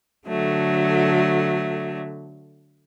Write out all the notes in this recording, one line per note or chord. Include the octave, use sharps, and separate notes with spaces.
D3 F#3 A3